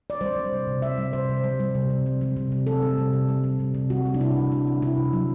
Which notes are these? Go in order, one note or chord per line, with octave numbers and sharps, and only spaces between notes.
D5
G3 C5
G3
C3
C3
G3 E5
G3
C3 C5
C3
G3
G3
C3
C3
G3
G3
C3
C3
G3 A4
G3
C3
C3
G3
G3
C3
C3
G3 F#4
G3
D4
C3 E4
C3
G3 D4
G3
C3 E4
C3
F#3